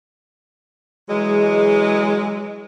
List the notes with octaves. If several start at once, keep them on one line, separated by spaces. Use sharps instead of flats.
E3 F#3 G#3